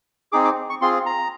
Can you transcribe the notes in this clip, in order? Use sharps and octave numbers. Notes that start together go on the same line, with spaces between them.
C4 D#4 G#4 D6
D6
C#6
C4 F4 G#4 C6
A#5